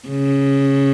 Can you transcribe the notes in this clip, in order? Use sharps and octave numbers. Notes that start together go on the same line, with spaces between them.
C#3